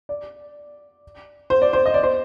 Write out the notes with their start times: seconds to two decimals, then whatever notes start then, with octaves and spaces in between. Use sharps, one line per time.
0.09 D5
1.50 C5
1.62 D5
1.73 C5
1.86 D#5
1.94 D5
2.03 C5